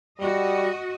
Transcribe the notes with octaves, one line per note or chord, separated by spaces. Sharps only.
G3 F#4 D#5